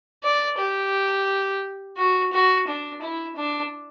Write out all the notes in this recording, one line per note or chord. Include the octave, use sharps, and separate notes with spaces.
D5
G4
F#4
F#4
D4
E4
D4